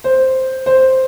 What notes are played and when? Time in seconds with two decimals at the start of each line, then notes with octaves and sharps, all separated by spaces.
0.04 C5
0.66 C5